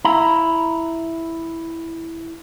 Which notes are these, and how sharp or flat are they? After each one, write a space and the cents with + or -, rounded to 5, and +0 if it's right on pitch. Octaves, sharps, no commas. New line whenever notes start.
E4 +0 A#5 +0